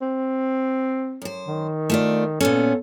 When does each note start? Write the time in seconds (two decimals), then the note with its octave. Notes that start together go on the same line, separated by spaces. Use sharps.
0.01 C4
1.22 F#2 C5
1.47 D#3
1.90 A3 F4 D5
2.41 A#2 B3 C#4 A4